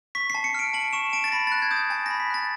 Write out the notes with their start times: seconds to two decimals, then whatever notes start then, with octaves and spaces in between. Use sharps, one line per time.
0.15 C#6 B6
0.30 A5 C7
0.44 C#7
0.54 F6 D7
0.74 A5 F#7
0.93 C#6 E7
1.13 A5 D7
1.24 A6
1.32 B5 A#6
1.47 F#6 A6
1.62 G#6
1.71 D#6 G6
1.76 G#6
1.90 G#5 A6
2.06 B5 A#6
2.20 B6
2.30 F#6 A6